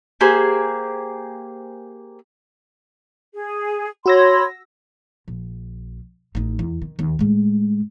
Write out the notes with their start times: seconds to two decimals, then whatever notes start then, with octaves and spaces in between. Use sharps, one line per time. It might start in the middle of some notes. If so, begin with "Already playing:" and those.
0.21 A#3 G4 G#4 C5
3.34 G#4
4.06 F#4 C#5 B5 C6 E6 A#6
5.28 A#1
6.35 A1 D#4
6.59 E2
6.82 D#3
6.99 D#2
7.19 A2 G#3